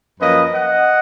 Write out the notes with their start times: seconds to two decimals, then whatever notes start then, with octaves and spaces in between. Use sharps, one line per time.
0.20 F#2 F3 A#3 C#4 B4 D#5
0.54 D#5 F#5